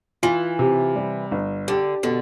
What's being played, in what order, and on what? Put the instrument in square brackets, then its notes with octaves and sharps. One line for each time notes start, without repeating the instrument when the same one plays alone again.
[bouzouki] E3 [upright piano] F4
[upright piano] C3
G3
G1
[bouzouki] D3 [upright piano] G4
[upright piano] B2 [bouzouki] D3